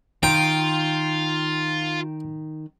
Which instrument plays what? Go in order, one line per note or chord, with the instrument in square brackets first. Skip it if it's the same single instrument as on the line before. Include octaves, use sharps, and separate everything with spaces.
[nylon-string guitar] D#3 [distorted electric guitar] F4 [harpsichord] G5